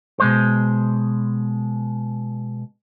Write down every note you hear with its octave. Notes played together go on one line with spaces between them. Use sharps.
B2 G#3 C5